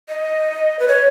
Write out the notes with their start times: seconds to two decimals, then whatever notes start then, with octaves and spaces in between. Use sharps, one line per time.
0.09 D#5
0.79 B4
0.88 C#5